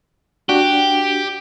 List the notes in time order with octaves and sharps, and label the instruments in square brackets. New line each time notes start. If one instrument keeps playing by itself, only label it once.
[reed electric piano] D4 F#4 [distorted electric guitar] G4